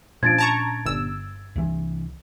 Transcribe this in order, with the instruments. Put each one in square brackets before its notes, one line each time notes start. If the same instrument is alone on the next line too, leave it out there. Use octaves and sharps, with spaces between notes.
[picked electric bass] A#2 C#4 D4 [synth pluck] F3 [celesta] G#6 A6 D7
[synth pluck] A5 A#5 C#6
G1 E6
[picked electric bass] C2 E3